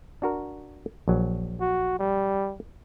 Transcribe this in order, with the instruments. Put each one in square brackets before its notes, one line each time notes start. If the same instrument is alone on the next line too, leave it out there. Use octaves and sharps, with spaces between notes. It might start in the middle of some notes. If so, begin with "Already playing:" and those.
[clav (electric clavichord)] D4 F#4 A#4
A#1 F#3
[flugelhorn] F#4
G3